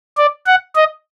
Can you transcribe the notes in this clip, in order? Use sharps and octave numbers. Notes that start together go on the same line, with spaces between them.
D5
F#5
D#5